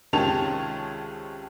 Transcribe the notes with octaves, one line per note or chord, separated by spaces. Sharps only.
C#2 C3 D#3 C#4 A5 F7